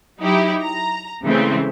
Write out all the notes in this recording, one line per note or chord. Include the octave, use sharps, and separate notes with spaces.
F#3 D#4 E4 G4
A#5
C#3 E3 G#3 A3 C4